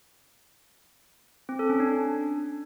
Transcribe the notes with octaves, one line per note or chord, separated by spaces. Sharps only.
C4
A4
C#4
D4